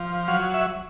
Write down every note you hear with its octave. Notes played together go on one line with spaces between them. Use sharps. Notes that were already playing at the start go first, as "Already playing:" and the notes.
Already playing: F3
F#3 F5
E5